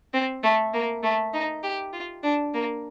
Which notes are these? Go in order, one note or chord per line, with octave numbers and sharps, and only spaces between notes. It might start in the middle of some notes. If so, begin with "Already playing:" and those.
C4
A3
A#3
A3
D#4
G4
F4
D4
A#3